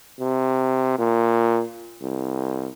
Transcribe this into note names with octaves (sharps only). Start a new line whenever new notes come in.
C3
A#2
C2